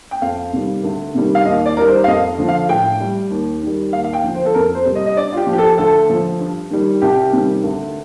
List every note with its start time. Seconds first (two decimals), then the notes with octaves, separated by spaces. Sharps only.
0.11 G5
0.22 F2 F5
0.53 C3 D#3 G3
0.84 D2
1.15 C3 D#3 G3
1.35 F5
1.45 D#2 D#5
1.66 D5
1.77 D#3 G3 A#4
1.87 C5
2.04 F5
2.07 F2 D#5
2.38 D3 F3
2.48 F5
2.69 A2 G5
3.00 G3
3.30 D#2
3.62 D#3 G3
3.93 D#2 F5
4.04 F5
4.13 G5
4.24 D3 F3
4.34 C5
4.46 A4
4.54 F2 A#4
4.75 C5
4.85 C3 G3
4.95 D#5
5.06 D#5
5.16 G2 D5
5.33 F4
5.37 G4
5.47 F3
5.53 G4
5.58 A4
5.78 D2 A4
6.09 D3 F3
6.40 G2
6.71 D#3 G3
7.02 C2 G4
7.33 C3 D#3 G3
7.64 D2